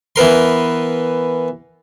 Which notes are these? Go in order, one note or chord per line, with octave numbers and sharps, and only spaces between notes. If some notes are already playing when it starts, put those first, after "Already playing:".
E3 B3 A#4 C6